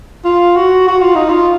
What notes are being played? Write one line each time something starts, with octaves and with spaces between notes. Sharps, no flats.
F4
F#4
F#4
F4
D#4
F4